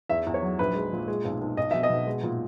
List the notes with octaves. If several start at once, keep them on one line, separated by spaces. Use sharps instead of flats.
E2 E5
E2
C#5
F#3
A#1 B4
G#3
A#2
G#3
B1
B1
B1 D#5
B2 E5
D#5
B2
G#3
A#2